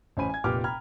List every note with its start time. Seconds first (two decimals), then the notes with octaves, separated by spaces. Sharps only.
0.17 A1 C#4 C5 G#5 B5 D#7
0.29 G#5 G#6
0.44 F1 A#2 G4 B4 D6 F6
0.64 G5 A#5 B5 F6 G#6